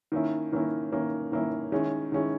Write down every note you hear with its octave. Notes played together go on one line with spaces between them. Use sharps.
D#3 A#3 C#4 E4
D#3 A#3 C#4 E4
D#3 A#3 C#4 E4
D#3 A#3 C#4 E4
D#3 G#3 C#4 E4
D#3 G#3 C#4 E4